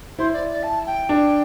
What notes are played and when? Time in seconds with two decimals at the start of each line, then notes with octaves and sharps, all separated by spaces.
0.19 E4 C5
0.33 D5
0.49 D5
0.63 A5
0.86 G5
1.09 D4